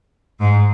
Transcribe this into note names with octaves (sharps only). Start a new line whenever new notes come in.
G#2